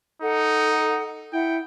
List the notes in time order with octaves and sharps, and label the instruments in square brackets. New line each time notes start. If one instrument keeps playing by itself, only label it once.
[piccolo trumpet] D#4 [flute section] A4 F#5
[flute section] E4 F#5 [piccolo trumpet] G5